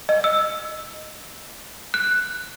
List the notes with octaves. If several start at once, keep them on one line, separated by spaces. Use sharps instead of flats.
D#5
E6
F#6